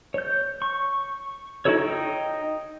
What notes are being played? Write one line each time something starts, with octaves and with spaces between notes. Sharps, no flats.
C#5 G6
C#6
D#4 E4 F#4 A4 C#5
D#4 G5